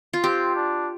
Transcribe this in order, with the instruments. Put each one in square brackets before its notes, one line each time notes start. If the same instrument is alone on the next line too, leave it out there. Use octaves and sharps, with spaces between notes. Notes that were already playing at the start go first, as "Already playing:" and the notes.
[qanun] F4
[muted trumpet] C4 [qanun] G4
[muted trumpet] D4